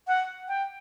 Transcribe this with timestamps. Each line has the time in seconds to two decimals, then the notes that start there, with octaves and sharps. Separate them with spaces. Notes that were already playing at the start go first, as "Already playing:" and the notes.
0.07 F#5
0.48 G5